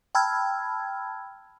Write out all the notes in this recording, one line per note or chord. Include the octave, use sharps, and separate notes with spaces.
G5 A5 B5 E6 F6 G#6